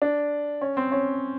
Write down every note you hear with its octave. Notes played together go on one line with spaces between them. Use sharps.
D4
C#4
C4
C#4